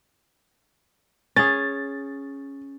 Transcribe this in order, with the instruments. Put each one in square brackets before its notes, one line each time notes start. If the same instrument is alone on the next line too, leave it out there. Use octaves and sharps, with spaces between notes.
[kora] C#4 G#4 [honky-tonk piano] A6